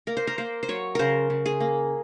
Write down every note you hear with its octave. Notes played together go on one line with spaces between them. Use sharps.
A#3 A#4
C5
A#4
A#3 C5
C5
F#3 C#5
C#3 A#4 C5
C#3
G#4
A#3